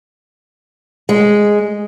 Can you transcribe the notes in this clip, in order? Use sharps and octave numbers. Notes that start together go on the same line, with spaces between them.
G#3